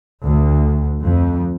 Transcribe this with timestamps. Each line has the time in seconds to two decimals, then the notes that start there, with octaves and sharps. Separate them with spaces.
0.24 D2
1.03 F2